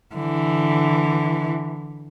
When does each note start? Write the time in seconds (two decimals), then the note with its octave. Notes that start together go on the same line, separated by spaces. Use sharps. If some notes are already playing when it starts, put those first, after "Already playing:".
0.15 D3 E3